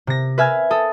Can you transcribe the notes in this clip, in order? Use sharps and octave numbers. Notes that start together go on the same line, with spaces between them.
C3 A#6
B4 E5 G#5 F6 G#6
A4 D#6